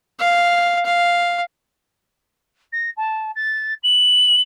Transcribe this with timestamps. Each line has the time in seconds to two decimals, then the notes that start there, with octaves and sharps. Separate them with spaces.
0.19 F5
0.85 F5
2.72 A#6
2.97 A5
3.35 A6
3.83 F#7